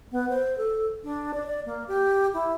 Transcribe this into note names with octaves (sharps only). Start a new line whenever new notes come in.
B3
C5
A4
D4
D5
D5
A#3
G4
E4